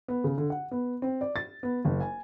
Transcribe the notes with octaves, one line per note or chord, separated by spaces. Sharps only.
B3
C#3
D3
F#5
B3
C4
D5
A6
B3
F#1
G#5